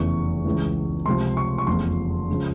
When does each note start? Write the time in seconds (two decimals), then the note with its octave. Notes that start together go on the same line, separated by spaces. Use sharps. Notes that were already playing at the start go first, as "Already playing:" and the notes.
Already playing: F1 E2 C#3 E3 C#6
0.45 C#2 C#3 E3
1.06 C#2 C3 F3 C6
1.37 C#6
1.58 C#6
1.67 F1 E2 C#3 F3 C6
2.28 C#2 C#3 F3